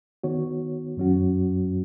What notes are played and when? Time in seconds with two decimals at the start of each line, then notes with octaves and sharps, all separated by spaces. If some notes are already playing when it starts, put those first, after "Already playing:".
0.24 D#3 B3 F#4 C#5
0.97 F#2 F#3 C#4 F#4